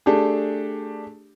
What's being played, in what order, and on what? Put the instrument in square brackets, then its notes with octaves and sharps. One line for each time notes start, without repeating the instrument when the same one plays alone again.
[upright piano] A3 D4 G4 G#4